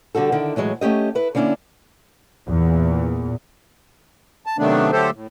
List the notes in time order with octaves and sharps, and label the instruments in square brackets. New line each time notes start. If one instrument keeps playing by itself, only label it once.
[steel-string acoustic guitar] D3 G3 F#4 A4
D3 D#3 E4
A2 E3 F#3 G#3
A3 C#4 G4 D#5
E4 B4
D3 A#3 C#4 D4 E4
[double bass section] E2 A#2
[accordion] A5
C3 D#3 F#3 A3 B3 D4
D3 F#3 A3 G4 A4 C5
A2